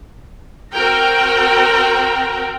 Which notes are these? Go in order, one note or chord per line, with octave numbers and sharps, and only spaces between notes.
C4 F#4 A#4 G5 A#5